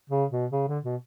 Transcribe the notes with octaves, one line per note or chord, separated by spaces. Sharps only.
C#3
B2
C#3
D3
B2